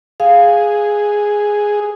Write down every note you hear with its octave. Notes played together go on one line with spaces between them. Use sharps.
G#4 F5